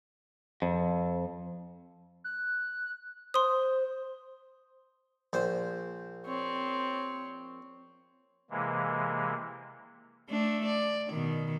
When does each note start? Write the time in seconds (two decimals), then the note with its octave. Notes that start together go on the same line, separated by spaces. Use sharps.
0.62 F2
2.24 F#6
3.34 C5 C6 D#6
5.33 A#1 C5
6.27 C4 C#5
8.50 C3 E3 G#3 A#3
10.30 A3 D4
10.66 D5
11.09 B2 D#3